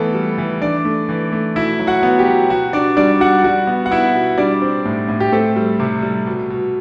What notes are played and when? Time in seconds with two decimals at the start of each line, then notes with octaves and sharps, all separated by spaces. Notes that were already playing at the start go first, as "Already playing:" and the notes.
Already playing: E3 A3 B3 A4
0.15 G3
0.38 E3
0.61 E3 D4 D5
0.85 A3
1.09 E3
1.32 A3
1.56 B2 E4 E5
1.79 F#3
1.87 F#4 F#5
2.03 B3
2.19 G4
2.26 F#3
2.50 B2 F#4
2.73 B2 D4 D5
2.97 G3 D4 D5
3.20 G3 F#4 F#5
3.44 G3 F#4 F#5
3.67 B3
3.86 F#5
3.91 B3 E4 E5
4.15 B2
4.38 G3 D4 D5
4.62 C4
4.85 A2
5.08 A2
5.20 G4
5.32 A3 C4 A4
5.56 G3
5.80 C3
6.02 G3
6.27 B2
6.50 B2